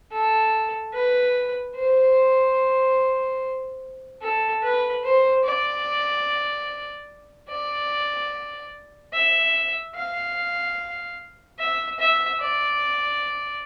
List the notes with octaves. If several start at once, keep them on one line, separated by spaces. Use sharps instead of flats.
A4
B4
C5
A4
B4
C5
D5
D5
E5
F5
E5
E5
D5